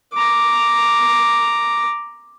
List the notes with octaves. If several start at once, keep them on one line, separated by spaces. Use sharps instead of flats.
A#5 D6